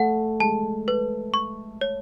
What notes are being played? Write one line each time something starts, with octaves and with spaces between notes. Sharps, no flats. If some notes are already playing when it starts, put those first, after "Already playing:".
Already playing: A3 F#5
G#3 A5
B4
C#6
C#5